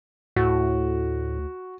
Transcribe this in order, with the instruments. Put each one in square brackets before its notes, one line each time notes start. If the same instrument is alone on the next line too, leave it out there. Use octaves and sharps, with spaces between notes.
[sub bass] D2 [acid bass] A2 [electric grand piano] F#4